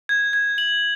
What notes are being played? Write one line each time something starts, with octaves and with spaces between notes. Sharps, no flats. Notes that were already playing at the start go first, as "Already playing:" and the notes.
G#6
G#6
F#7